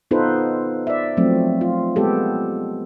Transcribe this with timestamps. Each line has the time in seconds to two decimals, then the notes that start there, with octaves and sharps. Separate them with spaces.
0.11 B3 D#4 F4 A4 B4 C5
0.87 D5 E5
1.17 F3 F#3 A3 C4
1.61 F4
1.96 G#3 B3 G4 A4